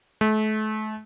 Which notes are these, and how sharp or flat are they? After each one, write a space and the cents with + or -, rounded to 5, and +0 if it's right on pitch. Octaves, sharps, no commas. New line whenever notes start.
A3 -35